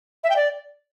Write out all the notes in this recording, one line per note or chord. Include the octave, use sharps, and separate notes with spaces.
E5
G5
D5